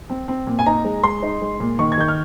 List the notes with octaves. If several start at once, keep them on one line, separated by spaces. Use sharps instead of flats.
C4
C4
A#2
G#5
D#4 A#5
G#3
G#3 C6
D#4
G#3
A#2
D#3 C#6
G#6
D#3 G6
F6